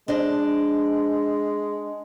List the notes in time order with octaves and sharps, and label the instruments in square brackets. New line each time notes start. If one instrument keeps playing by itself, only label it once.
[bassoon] G#3 [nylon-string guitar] D4 C5 D#5